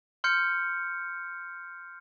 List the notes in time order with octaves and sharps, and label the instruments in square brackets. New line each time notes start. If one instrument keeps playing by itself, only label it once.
[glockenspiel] C6 F6 G6 C#7